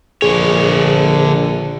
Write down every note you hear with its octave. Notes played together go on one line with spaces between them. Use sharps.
A#1 D3 G#4 C#5